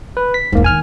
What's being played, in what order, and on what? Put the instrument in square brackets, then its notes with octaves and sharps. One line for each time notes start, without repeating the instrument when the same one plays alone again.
[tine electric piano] B4
B6
[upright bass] E1 E2 [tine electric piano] G#2 A#3
[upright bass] D#3 B3 [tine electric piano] G#5 F6